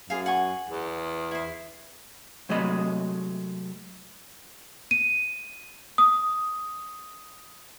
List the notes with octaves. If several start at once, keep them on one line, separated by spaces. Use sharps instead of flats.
F#2 G#4 F5
F#5 G#5 C#6
E2
E4 C5
C3 F#3 G#3 A3 D#5 B5
D#7
D#6